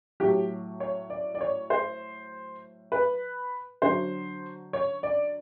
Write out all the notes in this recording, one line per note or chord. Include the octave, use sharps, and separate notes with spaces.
A2 F#3 G4
C#5
D5
D5
C#5
C5
B4
D3 F#3 C5
C#5
D5